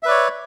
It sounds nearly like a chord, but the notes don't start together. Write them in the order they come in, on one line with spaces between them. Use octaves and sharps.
E5 B4 D5 C#5